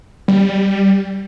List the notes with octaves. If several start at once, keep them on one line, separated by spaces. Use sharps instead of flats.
G3